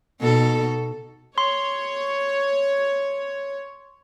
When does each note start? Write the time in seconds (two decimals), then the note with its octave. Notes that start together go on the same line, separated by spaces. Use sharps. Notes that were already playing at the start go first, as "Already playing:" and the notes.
0.20 B2 D#4 A4
1.38 C#5 C6